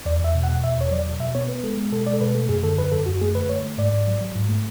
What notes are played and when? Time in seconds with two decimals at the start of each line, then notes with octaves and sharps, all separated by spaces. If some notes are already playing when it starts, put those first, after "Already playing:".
0.05 E2 D5
0.20 E2 E5
0.35 B2
0.43 F#5
0.48 B2
0.63 E2 E5
0.78 E2 C#5
0.91 F#3 D5
1.06 B2
1.20 B2 E5
1.35 B3 C#5
1.48 B3 B4
1.63 G#3 A4
1.77 G#3
1.92 B2 A4
2.06 G#3 D5
2.13 A4
2.21 B2 B4
2.35 A3 A4
2.49 F#2 G#4
2.64 D3 A4
2.78 F#2 B4
2.92 F#2 A4
3.06 F#2 F#4
3.21 A3 G#4
3.35 D3 B4
3.49 A3 C#5
3.64 A3
3.78 G#2 D5
3.92 G#2
4.07 F#3
4.21 F#3
4.35 G#2
4.49 A3